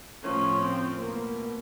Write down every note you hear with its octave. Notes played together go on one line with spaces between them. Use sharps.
A2 F3 C#4
C4
B2 A#3